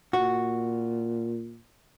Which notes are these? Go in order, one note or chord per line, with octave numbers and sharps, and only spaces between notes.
A#2 F#4